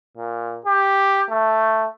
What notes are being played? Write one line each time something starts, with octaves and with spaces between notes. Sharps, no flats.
A#2
G4
A3